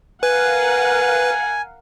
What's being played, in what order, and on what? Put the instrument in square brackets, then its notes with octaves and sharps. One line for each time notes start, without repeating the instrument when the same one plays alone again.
[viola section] A#4 F5 F#5 [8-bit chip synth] B4 [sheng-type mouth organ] G#5